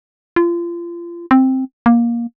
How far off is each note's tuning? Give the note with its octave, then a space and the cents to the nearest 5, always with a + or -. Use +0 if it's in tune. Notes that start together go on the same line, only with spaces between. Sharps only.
F4 -30
C4 +5
A#3 +15